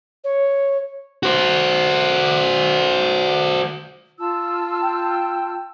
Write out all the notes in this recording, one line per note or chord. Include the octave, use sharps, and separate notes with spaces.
C#5
F#4 C5
F4 A5 E6
G5